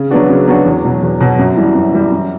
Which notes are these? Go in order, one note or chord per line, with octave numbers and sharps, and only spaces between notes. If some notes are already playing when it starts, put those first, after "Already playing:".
Already playing: C#3
F#3 B3 D4 F#4
C#3
F#3 B3 D4 F#4
E2
B2 F#3
E2
B2 F#3
F#2
E3 G3
F#2
E3 G3
F#2